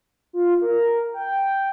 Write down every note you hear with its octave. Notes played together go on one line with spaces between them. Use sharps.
F4
A#4
G5